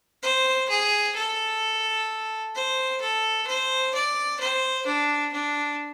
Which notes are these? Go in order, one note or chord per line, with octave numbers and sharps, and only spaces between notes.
C5
G#4
A4
C5
A4
C5
D5
C5
D4
D4